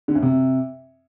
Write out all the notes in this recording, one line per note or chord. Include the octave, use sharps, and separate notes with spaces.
D3
F#2
C3